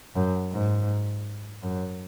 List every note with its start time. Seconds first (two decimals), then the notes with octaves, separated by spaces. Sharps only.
0.15 F#2
0.52 G#2
1.63 F#2